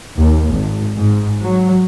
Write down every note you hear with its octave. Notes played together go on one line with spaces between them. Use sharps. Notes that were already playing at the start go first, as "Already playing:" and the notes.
D#2
G#1
G#2
F#3